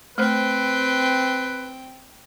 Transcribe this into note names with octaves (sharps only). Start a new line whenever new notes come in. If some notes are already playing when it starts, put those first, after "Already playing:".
A3 C4 B4 C5 G5